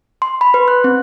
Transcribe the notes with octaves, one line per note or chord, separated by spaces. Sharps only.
C6
B5
B4
F#6
C4